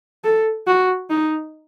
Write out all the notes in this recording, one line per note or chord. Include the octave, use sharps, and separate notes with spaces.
A4
F#4
D#4